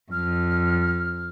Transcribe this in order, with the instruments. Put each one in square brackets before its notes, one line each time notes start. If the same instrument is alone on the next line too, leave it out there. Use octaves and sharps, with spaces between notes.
[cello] F2 [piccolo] F6